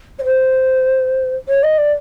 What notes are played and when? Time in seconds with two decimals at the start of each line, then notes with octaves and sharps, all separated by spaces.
0.19 C#5
0.24 C5
1.48 C#5
1.63 D#5
1.78 D5